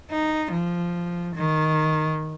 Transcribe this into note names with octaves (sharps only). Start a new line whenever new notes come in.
D#4
F3
D#3